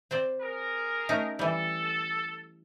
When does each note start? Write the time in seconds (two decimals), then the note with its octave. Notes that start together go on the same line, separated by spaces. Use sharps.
0.11 C4 C5 D5
0.41 G#4 A#4
1.09 A3 C#4 D#4
1.39 E3 G3 A4